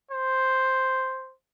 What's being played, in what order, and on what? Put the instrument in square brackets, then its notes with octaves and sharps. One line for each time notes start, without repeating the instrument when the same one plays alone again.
[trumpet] C5